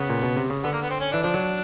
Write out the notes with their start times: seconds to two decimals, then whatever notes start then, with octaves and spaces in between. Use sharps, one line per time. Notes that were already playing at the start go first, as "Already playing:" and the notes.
Already playing: C#3 B3
0.09 A#2
0.23 B2
0.37 C3
0.50 C#3
0.63 D3 B3
0.72 A#3
0.82 B3
0.90 C4
1.00 C#4
1.12 E3 D4
1.22 F3 D4
1.34 F#3